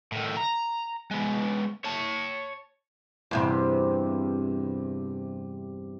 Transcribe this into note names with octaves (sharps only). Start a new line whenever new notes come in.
A2 D#3
A#5
G#3 B3
C#5 A5
E2 G2 C3